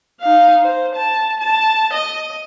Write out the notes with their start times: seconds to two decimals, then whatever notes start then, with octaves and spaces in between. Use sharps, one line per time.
0.21 D#4 F5
0.63 C5
0.95 A5
1.40 A5
1.93 D#5